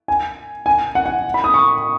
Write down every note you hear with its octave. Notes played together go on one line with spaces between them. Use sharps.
G#5
G#5
F#5
F#5
B5
D#6
C#6